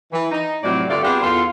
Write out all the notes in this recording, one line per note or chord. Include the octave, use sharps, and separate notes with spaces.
E3
D#4
F2 A2 C3 F#3 C4 D5
G2 D3 A3 F4 D5
B3 C4 D4 F4 G4 G#4
E2 F4 A4